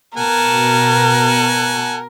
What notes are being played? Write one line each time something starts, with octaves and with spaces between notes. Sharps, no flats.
B2 A#4 F#5 G#5 A5